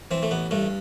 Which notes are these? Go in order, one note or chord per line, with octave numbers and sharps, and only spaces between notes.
E3 C4
A3
A1 B3
G2 A3